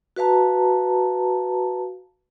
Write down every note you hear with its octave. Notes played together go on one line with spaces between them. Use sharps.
F#4 B4 F5 A5 A#5